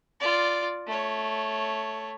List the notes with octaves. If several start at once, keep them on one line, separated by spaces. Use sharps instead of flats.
F4 D5
A3 C#5